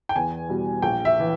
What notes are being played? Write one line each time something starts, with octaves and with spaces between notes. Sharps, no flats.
G5
E2 G#5
B2 G3
A#1 G5
E5
E3